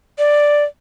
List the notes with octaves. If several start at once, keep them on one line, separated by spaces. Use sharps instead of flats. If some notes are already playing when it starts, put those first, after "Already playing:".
D5